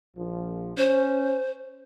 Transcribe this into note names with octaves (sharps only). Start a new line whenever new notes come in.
A#1 F3
C#4 C5